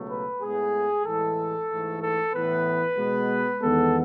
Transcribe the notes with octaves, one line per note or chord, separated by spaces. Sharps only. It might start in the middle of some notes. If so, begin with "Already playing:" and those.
Already playing: C#2 B2 F#3 A3
B4
A2 G#3 B3 G#4
A2 E3 G#3 A4
G#2 E3 A3
A4
A2 E3 B3 B4
B2 G#3 B3
E2 D#3 G#3 B3 A4